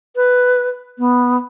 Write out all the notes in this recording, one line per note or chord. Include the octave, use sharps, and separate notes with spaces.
B4
B3